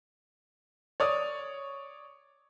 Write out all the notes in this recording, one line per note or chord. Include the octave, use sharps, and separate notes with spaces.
C#5 D5 D#6